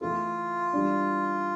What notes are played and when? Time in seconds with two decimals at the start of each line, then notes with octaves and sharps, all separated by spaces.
0.01 E3 A3 E4 F4 A4
0.73 E3 G3 D4